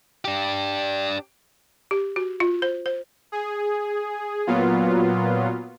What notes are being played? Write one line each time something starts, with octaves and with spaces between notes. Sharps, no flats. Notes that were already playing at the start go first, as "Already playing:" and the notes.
D4 G4
G4
F#4
F4
C5
C5
G#4
A#2 F#3 B3 F4